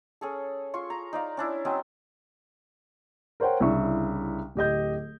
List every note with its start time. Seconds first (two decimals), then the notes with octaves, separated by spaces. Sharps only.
0.21 C#4 G#4 A4
0.74 F4 C6 C#6
0.90 A#5
1.13 D#4 D5 F5
1.37 C#4 D4 E4
1.65 F#3 C4 C#4 D#5
3.40 A#4 C5 C#5 F#5 G5
3.60 C2 C#3 D4 E4 E5 C#6
4.55 D1 G4 D#5 G6